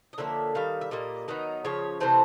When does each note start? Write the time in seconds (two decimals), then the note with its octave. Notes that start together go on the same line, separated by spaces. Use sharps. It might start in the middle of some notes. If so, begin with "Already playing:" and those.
0.13 D#5
0.18 D3 F3 A#3 C#4 E5
0.55 D#3 G3 F5
0.81 E5
0.91 A#2 G3 A#3 D#5
1.28 D#3 F#3 B3 D#4
1.65 C#3 F3 C#5
2.00 C3 E3 A3 C5